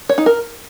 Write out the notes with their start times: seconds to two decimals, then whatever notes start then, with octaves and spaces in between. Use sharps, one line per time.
0.09 C#5
0.18 D#4
0.26 A#4